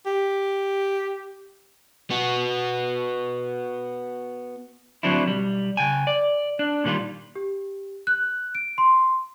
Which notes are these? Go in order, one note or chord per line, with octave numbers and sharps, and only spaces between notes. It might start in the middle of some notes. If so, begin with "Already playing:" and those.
G4
B3 F#4
D3 F#3 C4 D4 E4
B1 G3
C#3 G5 G#5
D5
D4
A#2 D#3 G3 F4
G4
F#6
D7
C6